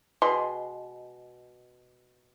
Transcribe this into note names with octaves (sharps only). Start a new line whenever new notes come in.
B2 G#3 C6